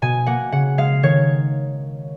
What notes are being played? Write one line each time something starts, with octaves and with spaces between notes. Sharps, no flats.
B2 G#5
A#3 F#5
C#3 F#5
G#3 F5
D#3 C#5